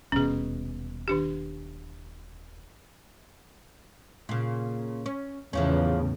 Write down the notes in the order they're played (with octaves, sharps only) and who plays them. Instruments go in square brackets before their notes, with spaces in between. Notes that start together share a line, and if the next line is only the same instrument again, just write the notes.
[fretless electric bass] D#1 B2 [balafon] C#4 G#4
[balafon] D#3 D4 G4
[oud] A#2 C#3
C#4
[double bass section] E2 A2 C#3 [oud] E3 F3 C#4